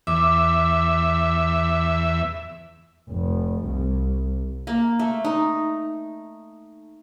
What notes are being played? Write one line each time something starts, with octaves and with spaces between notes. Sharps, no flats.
E2 E5 D6
F1
C2
A#3
A3
D#4